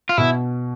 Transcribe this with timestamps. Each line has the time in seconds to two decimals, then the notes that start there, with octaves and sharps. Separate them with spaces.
0.09 F4
0.17 B2 E4